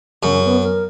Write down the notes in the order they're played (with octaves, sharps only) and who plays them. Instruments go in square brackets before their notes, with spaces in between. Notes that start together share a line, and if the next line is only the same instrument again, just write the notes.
[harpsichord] F#2 [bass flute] C#3
[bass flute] B3
A#4